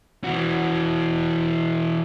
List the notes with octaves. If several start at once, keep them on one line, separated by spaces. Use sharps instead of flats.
E3 F#4